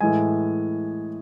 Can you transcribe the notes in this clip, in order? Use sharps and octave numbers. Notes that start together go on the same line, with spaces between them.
A2 E3 G#3 G#5